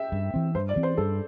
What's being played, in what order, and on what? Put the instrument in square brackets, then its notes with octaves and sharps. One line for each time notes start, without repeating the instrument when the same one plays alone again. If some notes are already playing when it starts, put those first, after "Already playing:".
Already playing: [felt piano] E5 G5
[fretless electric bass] G2
E3 C4
[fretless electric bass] G2 [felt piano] C5
[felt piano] D5
[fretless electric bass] E3 C4
[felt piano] C5
[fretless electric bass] G2 [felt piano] A4